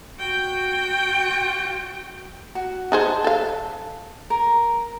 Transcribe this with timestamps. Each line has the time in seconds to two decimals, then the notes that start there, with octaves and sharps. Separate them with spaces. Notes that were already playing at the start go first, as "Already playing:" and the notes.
0.16 F#4 G5
2.55 F#4
2.92 D#4 G#4 C5 A5
3.24 A4 F5
4.30 A#4